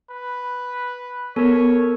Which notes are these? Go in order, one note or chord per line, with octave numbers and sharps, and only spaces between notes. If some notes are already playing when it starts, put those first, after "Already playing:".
B4
B3 A4 A#4 C#5